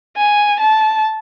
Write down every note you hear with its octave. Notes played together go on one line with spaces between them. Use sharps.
G#5
A5